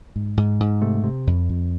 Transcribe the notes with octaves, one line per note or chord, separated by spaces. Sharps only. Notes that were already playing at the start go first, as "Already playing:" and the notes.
G#2
G#2
G#2
C3 A3
C3
F2
F2